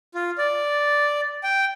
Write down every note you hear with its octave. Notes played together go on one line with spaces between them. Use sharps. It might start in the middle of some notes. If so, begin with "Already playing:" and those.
F4
D5
G5